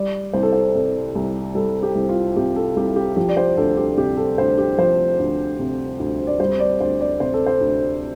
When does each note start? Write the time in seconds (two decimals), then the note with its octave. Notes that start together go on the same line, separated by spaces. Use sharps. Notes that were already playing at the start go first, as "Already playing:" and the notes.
Already playing: G3 D5
0.33 C2 C5
0.43 A4
0.53 C5
0.75 C3 A4
1.15 C2
1.55 G3 A4
1.83 G4
1.95 C2
2.09 F4
2.36 C3 G4
2.56 A4
2.76 C2 G4
2.96 G4
3.17 F3 G4
3.29 D5
3.37 C5
3.57 D2 A4
3.77 G4
3.97 C3 G4
4.17 A4
4.38 D2 C5
4.58 G4
4.78 F3 C5
5.19 D2
5.59 C3
5.99 D2
6.27 D5
6.40 G3 C5
6.60 D5
6.80 D2 C5
7.00 D5
7.20 C3 C5
7.34 A4
7.46 C5
7.61 D2